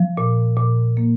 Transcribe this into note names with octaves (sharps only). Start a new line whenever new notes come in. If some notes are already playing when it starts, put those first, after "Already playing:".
Already playing: F3
A#2
A#2
A#3